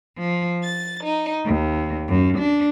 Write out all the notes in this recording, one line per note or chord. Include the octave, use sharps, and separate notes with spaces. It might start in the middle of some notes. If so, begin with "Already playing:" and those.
F3
A6
D#4
D#2
F#2
D4